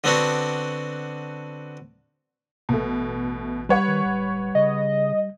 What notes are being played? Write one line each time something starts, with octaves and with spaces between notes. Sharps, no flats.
D3 B3 C4 D4 F#4
A1 B2 A3
G3 B4 C#5 F#5
D#3
D1
C#3 D#5